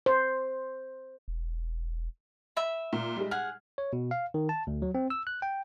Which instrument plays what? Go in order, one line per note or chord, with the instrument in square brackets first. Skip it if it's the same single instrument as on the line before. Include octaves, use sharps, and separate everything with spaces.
[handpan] C5
[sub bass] E1
[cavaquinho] E5 B5
[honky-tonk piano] A#2
G3 G#3
[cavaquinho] G#4 F#5 [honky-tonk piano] F6
[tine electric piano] C#5
B2
F5
D#3
A5
D2
F#3
C4
E6
F#6
G5